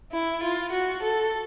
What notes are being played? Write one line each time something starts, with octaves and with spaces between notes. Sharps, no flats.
E4
F4
F#4
A4